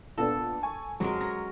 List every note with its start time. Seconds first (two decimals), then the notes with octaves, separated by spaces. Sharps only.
0.18 A#2 B3 D4 A4
0.63 G#5 C#6
1.00 F2 F#3 G#3 A#4 A#6
1.21 C#4 A#6